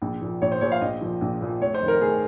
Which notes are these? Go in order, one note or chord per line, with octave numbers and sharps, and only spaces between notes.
A#1
A#2 F3
A#1 C#5
C5
A#2 F3 C#5
F5
A#1 D#5
A#2 F3
A#1
A#2 F3
F1 C#5
C5
F2 D#3
A#4
F1 G#4